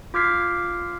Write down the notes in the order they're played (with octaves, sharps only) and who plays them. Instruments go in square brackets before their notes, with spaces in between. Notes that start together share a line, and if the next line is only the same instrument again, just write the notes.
[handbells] F4 D6 F6 G#6 B6 C7